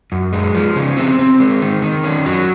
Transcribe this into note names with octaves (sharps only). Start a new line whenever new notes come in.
F#2
G#3
F3
C#3
C4
C4
G#3
D#3
D#3
C#4
F#3